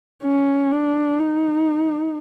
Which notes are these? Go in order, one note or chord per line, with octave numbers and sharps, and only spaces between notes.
C#4
D4
D#4